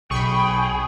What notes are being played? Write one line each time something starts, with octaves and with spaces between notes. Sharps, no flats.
B1 G#4 G5 B5 C#6